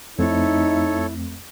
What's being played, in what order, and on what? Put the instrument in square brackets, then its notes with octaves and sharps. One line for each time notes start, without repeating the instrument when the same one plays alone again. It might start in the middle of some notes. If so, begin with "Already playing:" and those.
[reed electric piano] F2 A3 C4 [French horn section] D#4 [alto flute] E4 [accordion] A4 C#5